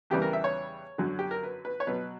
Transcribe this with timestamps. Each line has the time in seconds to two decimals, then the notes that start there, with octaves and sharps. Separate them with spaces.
0.10 E2 C#3 E3 G3 G4
0.22 A#4
0.33 E5
0.44 C#5
0.98 F#2 D3 F#3
1.19 G4
1.31 A#4
1.43 B4
1.65 B4
1.80 C#5
1.87 B2 F#3 B4